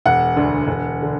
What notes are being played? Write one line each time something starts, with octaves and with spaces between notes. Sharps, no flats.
E1 F#5
D2 D3
E1
D3